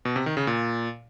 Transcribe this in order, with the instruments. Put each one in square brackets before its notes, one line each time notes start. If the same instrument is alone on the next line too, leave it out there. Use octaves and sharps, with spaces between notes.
[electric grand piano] B2
C3
D#3
C#3
A#2